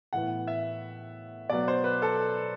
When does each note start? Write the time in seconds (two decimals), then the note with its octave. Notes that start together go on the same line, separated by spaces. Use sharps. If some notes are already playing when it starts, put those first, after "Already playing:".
0.13 A2 E3 B3 F#5
0.47 E5
1.49 B2 F#3 B3 D5
1.68 C5
1.84 B4
2.02 A4